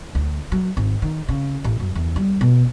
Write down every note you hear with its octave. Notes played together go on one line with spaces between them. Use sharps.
D2
F#3
G#1
D#3
C#3
A1
F#2
E2
G3
B2